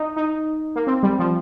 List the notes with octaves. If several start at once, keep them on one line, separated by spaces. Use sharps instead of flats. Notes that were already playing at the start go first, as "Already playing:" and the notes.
Already playing: D#4
D#4
A#3
C4
G3
F3